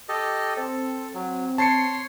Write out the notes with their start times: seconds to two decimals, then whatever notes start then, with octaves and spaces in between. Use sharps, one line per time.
0.09 G4 A4 D#5
0.57 C4 A4
1.14 F#3
1.58 C#5 A5 C6 C7 C#7